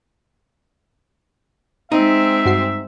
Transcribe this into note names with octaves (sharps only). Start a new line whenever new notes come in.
G#3 C4 D#4 E5
G2 F#4 C7